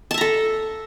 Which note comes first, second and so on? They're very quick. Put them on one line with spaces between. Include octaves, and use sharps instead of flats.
A5 E5 A#5 A4